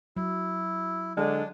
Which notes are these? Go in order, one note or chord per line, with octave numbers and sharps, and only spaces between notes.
F#3 E4
D3 G#3 D4